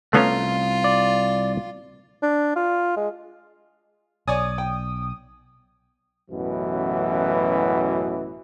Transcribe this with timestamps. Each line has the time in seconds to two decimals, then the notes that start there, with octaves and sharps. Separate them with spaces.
0.13 C2 A3 B3 C#4 F4 F5 A#5
0.84 D5
2.23 D4
2.56 F4
2.96 G#3
4.28 B1 C#5 D5 G#5 D#6
4.58 G5
6.31 A1 F#2 B2 E3